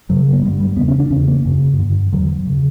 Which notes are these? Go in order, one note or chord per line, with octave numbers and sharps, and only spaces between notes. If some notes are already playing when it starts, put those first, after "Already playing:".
F#2 C#3 F#3
A#3
G2 D3 G3
G3
E2 C#3 B3
C#4
D4
E2 C#3 C#4
A#3
F#2 C#3
G2 D3
E2 D3 F#3
C#3